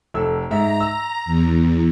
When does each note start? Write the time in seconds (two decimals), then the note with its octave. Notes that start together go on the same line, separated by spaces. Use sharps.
0.14 F1 A4 E6
0.51 G#2 E5 A#5
0.80 E6
1.25 E2